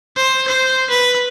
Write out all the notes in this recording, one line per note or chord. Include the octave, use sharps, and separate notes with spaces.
C5
C5
B4